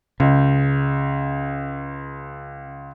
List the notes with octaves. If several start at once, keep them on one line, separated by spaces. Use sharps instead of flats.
C#2 C#3